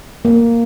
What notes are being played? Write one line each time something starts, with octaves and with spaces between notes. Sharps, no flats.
A#3